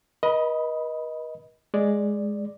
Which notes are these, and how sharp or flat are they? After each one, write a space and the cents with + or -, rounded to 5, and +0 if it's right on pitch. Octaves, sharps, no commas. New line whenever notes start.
B4 -45 D#5 +10 B5 +0
G#3 +0 D5 +0